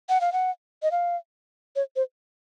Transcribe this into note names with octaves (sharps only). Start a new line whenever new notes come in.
F#5
F5
F#5
D#5
F5
C#5
C5